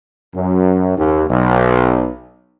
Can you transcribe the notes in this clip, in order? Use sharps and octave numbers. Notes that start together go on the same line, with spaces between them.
F#2
D#2
B1